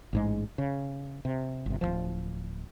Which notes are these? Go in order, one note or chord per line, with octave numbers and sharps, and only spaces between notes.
A1 G#2 G#3
C#3
C3
G1 C3
D1 C2 F3